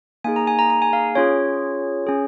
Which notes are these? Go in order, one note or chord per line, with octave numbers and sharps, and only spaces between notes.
A#3 D#4 G#4 G#5
A#5
G#5
A#5
A#5
G#5
F5
C#4 F4 G#4 C#5
C#4 G#4